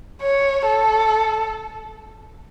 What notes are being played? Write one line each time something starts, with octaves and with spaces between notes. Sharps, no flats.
C#5
A4